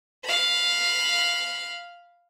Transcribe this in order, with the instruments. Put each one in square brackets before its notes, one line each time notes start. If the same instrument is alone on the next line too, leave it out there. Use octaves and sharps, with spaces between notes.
[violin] F5 B5